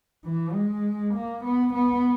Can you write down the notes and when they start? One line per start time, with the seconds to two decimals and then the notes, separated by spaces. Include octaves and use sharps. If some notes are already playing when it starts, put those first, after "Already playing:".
0.24 E3
0.54 G#3
1.14 A#3
1.44 B3
1.74 B3